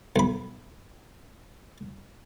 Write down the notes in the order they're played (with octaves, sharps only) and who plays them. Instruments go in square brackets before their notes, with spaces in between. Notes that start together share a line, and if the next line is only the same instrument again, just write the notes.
[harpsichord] B1 B5